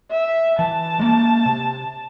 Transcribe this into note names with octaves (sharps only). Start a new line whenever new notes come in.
E5
E3 A5
G#3 A#3
C3